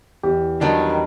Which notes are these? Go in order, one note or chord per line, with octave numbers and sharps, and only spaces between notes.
E2 G4
D#3 F#3 G3 D4